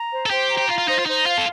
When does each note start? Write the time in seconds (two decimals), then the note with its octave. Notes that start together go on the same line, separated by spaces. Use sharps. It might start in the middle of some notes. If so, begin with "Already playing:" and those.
Already playing: A#5
0.12 C5
0.26 A4
0.30 G4 C5
0.49 A#5
0.58 G4
0.68 F4 F5
0.78 F4
0.87 D#4 C5
0.99 F4
1.06 D#4 C5
1.26 F4 F5
1.38 A4